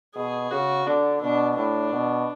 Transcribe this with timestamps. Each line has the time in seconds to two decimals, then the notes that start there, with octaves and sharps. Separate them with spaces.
0.15 B2 G#4
0.51 C#3 F#4
0.86 D3 D4
1.22 B2 D4
1.57 A2 D4
1.93 B2